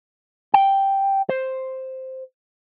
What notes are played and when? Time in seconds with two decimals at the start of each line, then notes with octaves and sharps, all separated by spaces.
0.54 G5
1.29 C5